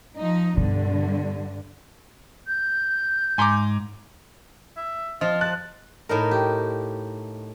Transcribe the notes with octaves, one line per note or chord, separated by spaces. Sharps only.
F3 D#4
G2 B2 D3
G6
G#2 G#5 A#5 C6 D6
E5
F3 C4 F4 D#5
A5 F#6
A2 D#4 A#4
G4